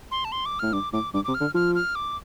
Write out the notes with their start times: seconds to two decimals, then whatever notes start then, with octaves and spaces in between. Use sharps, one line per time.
0.11 C6
0.25 A5
0.32 C6
0.46 D6
0.59 A2 F6
0.72 G2 D6
0.93 A2 D6
1.14 G2 D6
1.24 C3 D6
1.34 F6
1.41 D3
1.55 F3 F6
1.75 F6
1.95 D6